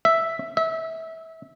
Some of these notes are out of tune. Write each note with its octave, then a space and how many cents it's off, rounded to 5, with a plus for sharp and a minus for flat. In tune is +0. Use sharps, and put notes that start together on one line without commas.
E5 +0
E5 -25